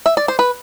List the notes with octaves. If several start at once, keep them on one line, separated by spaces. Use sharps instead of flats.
E5
D5
C5
B4